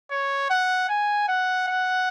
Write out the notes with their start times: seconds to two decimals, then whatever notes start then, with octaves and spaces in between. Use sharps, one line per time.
0.11 C#5
0.50 F#5
0.89 G#5
1.28 F#5
1.68 F#5